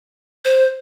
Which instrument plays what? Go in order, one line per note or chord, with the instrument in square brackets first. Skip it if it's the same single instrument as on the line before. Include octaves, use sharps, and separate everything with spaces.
[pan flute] C5